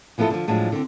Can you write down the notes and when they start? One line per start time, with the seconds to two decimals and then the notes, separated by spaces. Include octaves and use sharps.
0.18 E3 F3 B3 E4 A4 D#5
0.30 D3 F3
0.48 A2 F3 F#3 G#3 D4
0.72 D3 C4